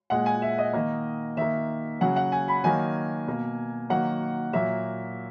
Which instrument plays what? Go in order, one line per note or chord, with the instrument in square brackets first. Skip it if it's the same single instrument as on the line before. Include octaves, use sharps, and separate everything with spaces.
[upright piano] A#2 G#3 F#5
G#5
E5
D#5
D#3 A#3
D#3 A#3 E5
C#3 F#3 A#3 F#5
F#5
G#5
B5
D#3 F#3 A#3 G#5
B2 A#3
D#3 F#3 A#3 F#5
A#2 F#3 A#3 E5